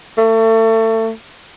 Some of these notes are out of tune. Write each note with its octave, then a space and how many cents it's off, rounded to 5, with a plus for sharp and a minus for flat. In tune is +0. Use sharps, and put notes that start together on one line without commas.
A3 +30